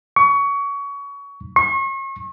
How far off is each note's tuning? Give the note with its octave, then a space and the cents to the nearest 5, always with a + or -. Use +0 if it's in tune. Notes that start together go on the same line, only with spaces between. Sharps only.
C#6 +25
C#6 -40